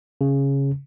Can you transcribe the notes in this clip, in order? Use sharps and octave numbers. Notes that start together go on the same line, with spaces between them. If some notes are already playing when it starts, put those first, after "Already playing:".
C#3